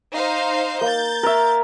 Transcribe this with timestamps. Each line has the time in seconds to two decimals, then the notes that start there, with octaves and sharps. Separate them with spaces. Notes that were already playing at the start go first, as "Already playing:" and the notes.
0.14 D#4 C5 F5
0.81 A#3 G6 A6
1.23 A#4 C#5 E5